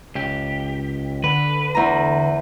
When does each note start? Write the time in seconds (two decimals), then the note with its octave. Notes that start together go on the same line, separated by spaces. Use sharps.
0.15 C#2 G4
1.24 D3 B4
1.75 E2 A#5